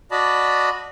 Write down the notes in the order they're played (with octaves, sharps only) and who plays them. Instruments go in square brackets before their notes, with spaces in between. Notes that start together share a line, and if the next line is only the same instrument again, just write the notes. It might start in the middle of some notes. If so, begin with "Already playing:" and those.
[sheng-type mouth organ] F#4 D5 D#5 A5 B5